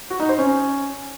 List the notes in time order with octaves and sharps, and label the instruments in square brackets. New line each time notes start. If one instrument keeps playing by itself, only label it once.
[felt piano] F#4
D#4
C5
C#4